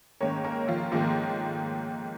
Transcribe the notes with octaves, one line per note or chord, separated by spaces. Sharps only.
G#2 D#3 A#3 C#4 C#5
A#3 A#4
F3 F4
G#2 D#3 F3 A#3 F4